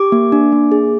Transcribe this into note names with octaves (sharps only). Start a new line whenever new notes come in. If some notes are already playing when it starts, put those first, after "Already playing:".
Already playing: G4 D6
A#3
D4
A#3
G#4